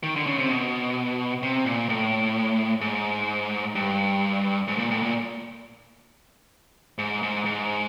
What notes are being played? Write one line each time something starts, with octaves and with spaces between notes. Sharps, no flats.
D#3
D3
C#3
C3
B2
C3
A#2
A2
G#2
G2
G#2
A#2
A2
A#2
G#2
G#2
G#2